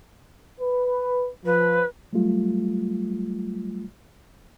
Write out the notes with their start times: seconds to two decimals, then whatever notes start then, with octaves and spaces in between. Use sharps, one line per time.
0.61 B4
1.45 F3 B4
2.13 F#3 G3 A3 F4